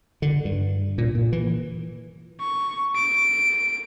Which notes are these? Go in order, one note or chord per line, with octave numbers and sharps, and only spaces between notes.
D3
G2
A#2
A#2
E3
C#6
D7